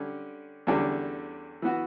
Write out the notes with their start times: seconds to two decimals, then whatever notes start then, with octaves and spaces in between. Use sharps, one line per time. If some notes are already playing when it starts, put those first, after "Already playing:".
Already playing: D3 G3 C#4
0.67 E2 D3 G3 C#4
1.62 E3 B3 F#4